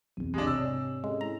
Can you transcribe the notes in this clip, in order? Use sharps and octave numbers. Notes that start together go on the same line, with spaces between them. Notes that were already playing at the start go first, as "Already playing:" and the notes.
B1 E2 C4
G#3 D4 G4 D#5 D#6
G#2 C3 C#5 G#5 E6
G#3 C#4 G4 A4
G#3 E4 A#5